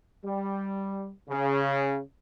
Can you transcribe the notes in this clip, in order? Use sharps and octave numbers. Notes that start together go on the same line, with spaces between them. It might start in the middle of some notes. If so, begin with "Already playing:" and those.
G3
C#3